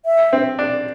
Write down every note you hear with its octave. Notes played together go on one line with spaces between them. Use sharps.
E5
C4
D4